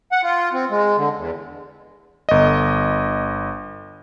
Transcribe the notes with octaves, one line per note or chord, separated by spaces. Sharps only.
F#5
F4
C4
G#3
D3
E2
G1 D#5